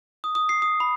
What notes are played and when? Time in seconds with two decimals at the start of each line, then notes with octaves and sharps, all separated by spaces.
0.24 D#6
0.35 D#6
0.49 C7
0.62 D#6
0.80 B5